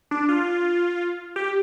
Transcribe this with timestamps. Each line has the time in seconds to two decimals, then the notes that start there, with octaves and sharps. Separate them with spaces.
0.11 D4
0.29 F4
1.36 G4